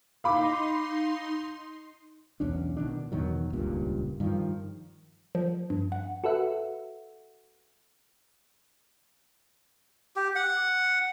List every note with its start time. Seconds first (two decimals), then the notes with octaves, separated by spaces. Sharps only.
0.24 D#4 F5 B5 C6 D6
2.40 B1 E2 C#4 D4
2.77 B2 D#3 D4
3.12 E2 B2 D#3 F#3
3.53 D#1 C#2 G2 A#2
4.20 G2 D#3 F3
5.35 F3
5.70 G2
5.92 F#5
6.24 F#4 A4 B4 E5 F#5
10.16 G4
10.35 F#5